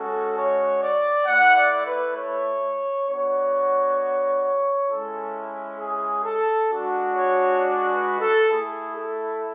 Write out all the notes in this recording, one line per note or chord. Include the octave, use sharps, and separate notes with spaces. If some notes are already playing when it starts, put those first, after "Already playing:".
Already playing: G#3 C#4 F#4 A4
C#5
D5
A3 E4 F#5
D5
B4
C#5
B3 D4 F#4 C#5
G#3 C#4 E4 A4
G#4
A4
G#3 D4 F#4
C#5
D5
B4
A4
A3 E4 G#4
A4